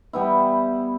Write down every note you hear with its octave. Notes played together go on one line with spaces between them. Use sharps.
G3 B3 E4